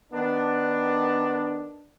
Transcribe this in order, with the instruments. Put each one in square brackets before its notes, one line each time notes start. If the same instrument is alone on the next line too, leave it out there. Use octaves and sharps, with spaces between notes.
[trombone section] D#3 B3 D4